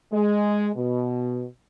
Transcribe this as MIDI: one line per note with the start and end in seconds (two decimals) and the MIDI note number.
0.13 0.70 56
0.76 1.44 47